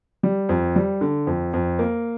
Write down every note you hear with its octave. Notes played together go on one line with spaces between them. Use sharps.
G3
F2
G3
D3
F2
F2
A#3